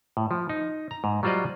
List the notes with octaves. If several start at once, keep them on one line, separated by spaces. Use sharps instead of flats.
A2
F3
D#4
A#5
G#2
F#3 G3 F4 C5 D5 D#5